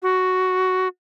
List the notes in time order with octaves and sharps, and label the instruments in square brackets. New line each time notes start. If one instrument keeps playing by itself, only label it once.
[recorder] F#4